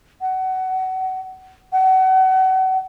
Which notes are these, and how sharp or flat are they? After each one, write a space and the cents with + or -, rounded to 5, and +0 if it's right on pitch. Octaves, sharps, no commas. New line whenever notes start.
F#5 +25
F#5 +30